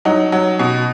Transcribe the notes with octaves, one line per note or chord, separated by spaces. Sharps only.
F#3 D#4
F#3
B2